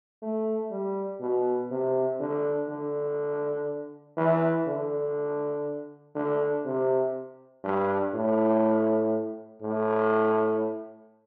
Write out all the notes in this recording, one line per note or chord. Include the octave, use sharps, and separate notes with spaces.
A3
G3
B2
C3
D3
D3
E3
D3
D3
C3
G2
A2
A2